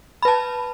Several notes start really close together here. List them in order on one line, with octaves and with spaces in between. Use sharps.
B5 B4 A5